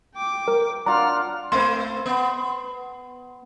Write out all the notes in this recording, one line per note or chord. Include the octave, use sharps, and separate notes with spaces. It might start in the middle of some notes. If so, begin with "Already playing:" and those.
G5 D6
A#4
D4 F4 F#5 A#5 F6
A3 C4 C5 C6
B3